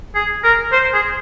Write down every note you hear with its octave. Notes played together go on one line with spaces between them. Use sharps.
G#4
A#4
C5
G#4